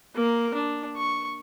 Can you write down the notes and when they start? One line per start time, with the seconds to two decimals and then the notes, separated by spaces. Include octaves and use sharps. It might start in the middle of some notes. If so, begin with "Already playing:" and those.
0.15 A#3 A#4
0.54 D4
0.97 C#6